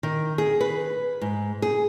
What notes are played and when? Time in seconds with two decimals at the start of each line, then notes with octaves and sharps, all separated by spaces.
0.03 D#3
0.38 G#4
0.61 B4
1.21 G#2
1.62 G#4